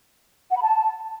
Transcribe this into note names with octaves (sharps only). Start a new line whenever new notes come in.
F#5
B5
A5